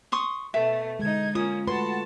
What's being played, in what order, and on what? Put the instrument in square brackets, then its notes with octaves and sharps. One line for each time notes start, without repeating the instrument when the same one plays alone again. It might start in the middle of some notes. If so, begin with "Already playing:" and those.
[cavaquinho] C6 C#6 D#6
[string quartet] B2 A3 [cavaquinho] E5
[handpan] D3 G#3 [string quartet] D#4 G#6
[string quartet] A#3 C#4 [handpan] F4 [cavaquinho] D#6
[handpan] A3 B4 [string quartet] F#4 A5 [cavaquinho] C6